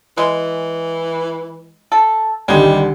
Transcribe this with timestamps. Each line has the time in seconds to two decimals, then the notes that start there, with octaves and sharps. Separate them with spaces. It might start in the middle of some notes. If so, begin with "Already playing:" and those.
0.18 E3 G#3
1.92 A4
2.48 C2 D3 D#3 G3 G#3 D#4